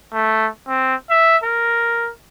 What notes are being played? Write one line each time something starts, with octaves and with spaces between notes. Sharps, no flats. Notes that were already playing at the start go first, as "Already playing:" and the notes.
A3
C4
E5
A#4